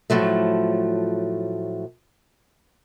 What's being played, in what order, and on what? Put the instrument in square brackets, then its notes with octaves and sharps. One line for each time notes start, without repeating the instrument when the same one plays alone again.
[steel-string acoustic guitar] A2 F3 F#3 A3